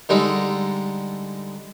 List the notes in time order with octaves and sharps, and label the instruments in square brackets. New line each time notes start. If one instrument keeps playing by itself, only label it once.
[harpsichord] D3 G3 G#3 D#4 A4